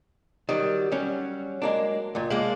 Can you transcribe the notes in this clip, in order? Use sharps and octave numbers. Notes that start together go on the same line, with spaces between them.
D#3 F#3 G3
F#3 G3 C#4
G#3 A#3 D4
C#2 A#2
G#3 A#3 D4